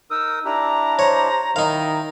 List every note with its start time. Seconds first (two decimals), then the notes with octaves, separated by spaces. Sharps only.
0.11 D#4 A#4 D#6 E6
0.45 D4 E4 G4 A#5
0.99 C5 C#5
1.56 D#3 D#4 E4 F5